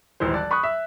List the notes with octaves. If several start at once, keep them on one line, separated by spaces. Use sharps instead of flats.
D#1 G#1 E3 C5
D5 A5 F#6
B5 C#6 D#6 F#6
E5